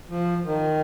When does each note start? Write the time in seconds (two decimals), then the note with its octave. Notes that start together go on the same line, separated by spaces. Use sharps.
0.09 F3
0.45 D#3